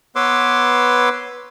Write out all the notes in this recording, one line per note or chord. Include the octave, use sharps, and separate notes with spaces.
B3 B4 C#5 C6 D6 E6